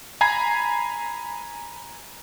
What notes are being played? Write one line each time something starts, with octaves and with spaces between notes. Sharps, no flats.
G#5 A#5 B5 G#6 C7